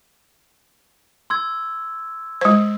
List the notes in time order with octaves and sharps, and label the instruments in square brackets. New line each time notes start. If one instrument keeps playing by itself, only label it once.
[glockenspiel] C6 E6 G#6
[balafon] G#3 C5